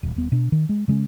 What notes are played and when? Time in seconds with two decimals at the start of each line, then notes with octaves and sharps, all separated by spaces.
0.03 D#1
0.16 D#1 B3
0.32 B2 D4
0.52 D#3
0.69 G#3
0.88 C#3 G#3 A#3 C#4